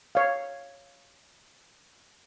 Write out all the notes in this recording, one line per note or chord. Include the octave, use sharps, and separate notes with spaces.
C#5 F5